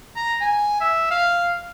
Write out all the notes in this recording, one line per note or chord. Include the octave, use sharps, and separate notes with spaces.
A#5
G#5
E5
F5